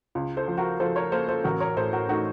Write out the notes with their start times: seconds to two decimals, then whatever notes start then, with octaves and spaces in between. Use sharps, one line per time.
0.15 C#2
0.37 A4 C5
0.48 F3
0.58 F#4 A#4
0.80 F3 A4 C5
0.96 A#4 C#5
1.12 A#3 A4 C5
1.28 A4 C5
1.44 A1 F#4 A#4
1.60 A#4 C#5
1.77 A2 A4 C5
1.93 F#4 A#4
2.09 A3 D#4 F#4